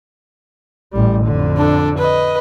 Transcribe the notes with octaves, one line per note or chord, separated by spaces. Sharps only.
A1 G3
F2 D3
D4 A4
B4 D#5